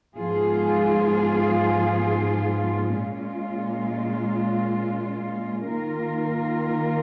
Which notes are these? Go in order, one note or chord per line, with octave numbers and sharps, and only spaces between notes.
G#2 F3 B3 F4 G#4
A#2 G#3 C#4 F4
D#3 A#3 F4 A#4